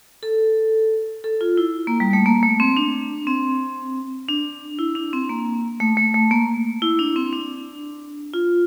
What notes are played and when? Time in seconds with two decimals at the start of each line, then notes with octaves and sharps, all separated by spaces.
0.23 A4
1.24 A4
1.41 F4
1.57 E4
1.87 A#3
2.00 G3
2.13 A3
2.26 A#3
2.43 A3
2.60 C4
2.77 D4
3.27 C4
4.29 D4
4.79 E4
4.95 D4
5.13 C4
5.30 A#3
5.80 A3
5.97 A3
6.14 A3
6.31 A#3
6.82 E4
6.99 D4
7.16 C4
7.33 D4
8.34 F4